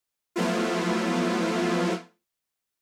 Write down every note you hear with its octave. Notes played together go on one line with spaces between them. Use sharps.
F3 F#3 A3 B3 E4 F4